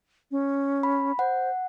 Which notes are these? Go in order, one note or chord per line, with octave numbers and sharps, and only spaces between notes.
C#4
B5
C5 F#5